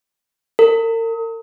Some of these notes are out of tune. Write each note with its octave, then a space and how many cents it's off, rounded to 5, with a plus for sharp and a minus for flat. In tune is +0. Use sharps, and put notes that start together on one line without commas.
A#4 -40